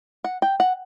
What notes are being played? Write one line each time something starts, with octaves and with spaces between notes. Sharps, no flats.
F#5
G5
F#5